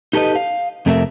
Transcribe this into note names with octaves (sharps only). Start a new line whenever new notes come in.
D#4 G4 A4 B4 D#5
F5
F2 C3 A3 D4 A#4 E5